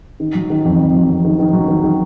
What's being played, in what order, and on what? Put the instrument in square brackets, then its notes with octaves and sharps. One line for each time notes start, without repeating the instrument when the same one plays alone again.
[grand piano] D#3
F#3
D#3
F2
F2
F#3
F2
D#3
D#3
F#3
D#3
D#3